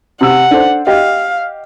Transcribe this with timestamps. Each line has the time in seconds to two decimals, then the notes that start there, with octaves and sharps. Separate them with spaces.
0.21 C3 F#5 E6
0.51 D4 A4 C5
0.87 G4 D#5 F5